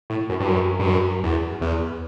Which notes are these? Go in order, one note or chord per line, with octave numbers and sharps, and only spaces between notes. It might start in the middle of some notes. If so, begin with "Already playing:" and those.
A2
F#2
G2
F#2
G2
F#2
E2
E2